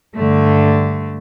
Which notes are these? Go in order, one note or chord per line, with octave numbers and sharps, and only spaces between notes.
G2 D3 A3